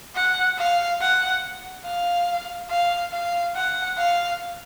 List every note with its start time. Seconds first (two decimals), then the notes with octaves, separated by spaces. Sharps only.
0.15 F#5
0.58 F5
1.01 F#5
1.85 F5
2.70 F5
3.12 F5
3.55 F#5
3.98 F5